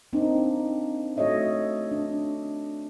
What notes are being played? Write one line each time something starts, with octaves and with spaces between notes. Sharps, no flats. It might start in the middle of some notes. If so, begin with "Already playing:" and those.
A#3 C4 D4 D#4
A3 F#4 A4 C#5 D#5 E5
D4